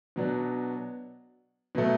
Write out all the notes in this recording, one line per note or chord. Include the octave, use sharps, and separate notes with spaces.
B2 F#3 B3 D4
B2 F#3 A3